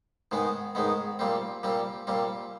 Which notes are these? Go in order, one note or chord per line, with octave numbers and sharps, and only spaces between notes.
G#2 D#3 G#3 B3
G#2 D#3 G#3 B3
A#2 G3 C4
A#2 G3 C4
A#2 G3 C4